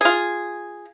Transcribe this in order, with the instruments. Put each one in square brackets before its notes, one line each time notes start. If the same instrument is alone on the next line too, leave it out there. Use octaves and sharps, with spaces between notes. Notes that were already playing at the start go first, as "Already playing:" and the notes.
[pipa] F4 G#4